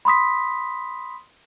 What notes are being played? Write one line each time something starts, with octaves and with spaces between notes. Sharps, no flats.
B5 C6 D#6 B6